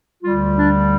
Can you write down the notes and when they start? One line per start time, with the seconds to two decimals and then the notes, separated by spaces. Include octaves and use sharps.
0.23 D2 D3 G3 F4
0.58 D4